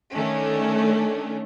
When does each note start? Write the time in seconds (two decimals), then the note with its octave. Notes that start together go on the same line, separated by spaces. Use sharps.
0.14 D#3 A3 C#4 D4